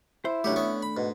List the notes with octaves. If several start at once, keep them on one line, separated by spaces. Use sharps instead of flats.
E4 C5
C#2 F#3 A3 D4 G4
B3 C#4 C#6
B5
G#2 B2